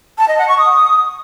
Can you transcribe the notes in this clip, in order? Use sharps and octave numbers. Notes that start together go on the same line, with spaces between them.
A5
D#5
F#5
C#6
D#6